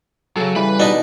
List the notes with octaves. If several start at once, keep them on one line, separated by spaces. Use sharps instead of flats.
C#3 F#3 A4
E3 G3 B4 B5
B2 D4 D#4